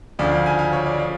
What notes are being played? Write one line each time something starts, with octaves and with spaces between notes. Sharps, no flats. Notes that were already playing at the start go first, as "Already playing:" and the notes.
D2 C#3 F3 D5
F5
G#5
F5
C#5
D5
F3 F5